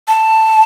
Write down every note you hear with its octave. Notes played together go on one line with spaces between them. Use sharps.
A5